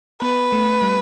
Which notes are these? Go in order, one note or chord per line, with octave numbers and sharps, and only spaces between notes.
B3 B4
A3
G3